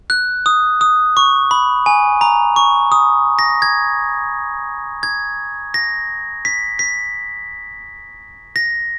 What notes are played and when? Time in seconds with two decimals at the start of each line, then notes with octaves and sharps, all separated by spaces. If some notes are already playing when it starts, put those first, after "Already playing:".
0.10 F#6
0.46 D#6
0.81 D#6
1.17 C#6
1.51 B5
1.86 G#5
2.21 A#5
2.56 C#6
2.92 D#6
3.39 A#6
3.62 G#6
5.03 G#6
5.74 A#6
6.45 B6
6.79 B6
8.56 A#6